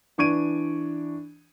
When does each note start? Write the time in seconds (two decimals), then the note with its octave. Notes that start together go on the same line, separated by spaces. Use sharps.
0.18 E3 D4 C#6 G#6 D7 D#7